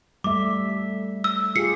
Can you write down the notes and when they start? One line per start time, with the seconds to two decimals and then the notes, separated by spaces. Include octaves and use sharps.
0.24 G3 A3 E5 D6
1.24 E6
1.55 F4 G4 G#4 C7 C#7